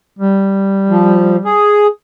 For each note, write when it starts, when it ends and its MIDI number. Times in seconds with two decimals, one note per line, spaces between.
0.19 1.56 55
0.89 1.36 53
1.45 1.87 68